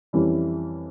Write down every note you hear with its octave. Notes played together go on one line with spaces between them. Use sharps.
F2 E3 G3 C#4 E4